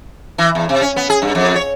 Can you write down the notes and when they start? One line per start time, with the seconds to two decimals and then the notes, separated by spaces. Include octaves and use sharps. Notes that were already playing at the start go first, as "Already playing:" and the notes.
0.38 E3
0.55 E2
0.69 C3
0.81 C#4
0.96 B3
1.10 G#4
1.22 G2
1.35 F2
1.55 C#5